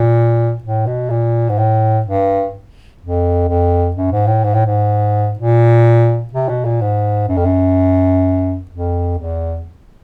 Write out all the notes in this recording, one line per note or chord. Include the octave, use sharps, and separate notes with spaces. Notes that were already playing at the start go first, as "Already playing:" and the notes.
Already playing: A#2
A2
B2
A#2
G#2
A2
G2
F2
F2
F#2
G#2
A2
G#2
A2
G#2
A#2
C3
B2
A#2
G#2
F#2
F2
F#2
F2
E2